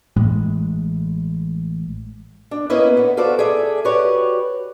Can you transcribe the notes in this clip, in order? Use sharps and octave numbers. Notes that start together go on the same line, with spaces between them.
A1 A2 G#3
D4
A#3 B3 C#4 E4 B4 D#5
D3 B3
F4 F#4 A4 B4 C5 D5
G#4 A4 D5 E5
F#4 G4 B4 C#5 D5